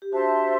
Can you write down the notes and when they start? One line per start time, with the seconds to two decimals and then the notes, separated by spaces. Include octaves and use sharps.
0.02 G4
0.12 D4 F#4 C5 E5 A5 C6